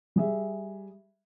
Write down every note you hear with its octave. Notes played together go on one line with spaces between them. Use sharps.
G3 G#4 E5